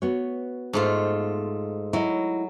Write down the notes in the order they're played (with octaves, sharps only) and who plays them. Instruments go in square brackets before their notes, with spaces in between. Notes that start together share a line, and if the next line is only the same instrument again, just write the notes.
[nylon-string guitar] B3 F#4 C#5
[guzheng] G#2 A3 F4
[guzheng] F#3 [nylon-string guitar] E4 D#5